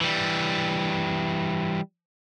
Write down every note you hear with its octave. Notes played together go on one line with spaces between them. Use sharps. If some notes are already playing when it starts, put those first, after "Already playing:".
E3 G3